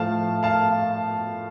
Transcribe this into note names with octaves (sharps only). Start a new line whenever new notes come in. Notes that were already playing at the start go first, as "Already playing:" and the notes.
Already playing: A2 F3 A3 F5 A5
F5 A5